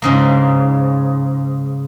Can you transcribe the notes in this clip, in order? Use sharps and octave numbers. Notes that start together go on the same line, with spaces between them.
G#2 C#3 A#3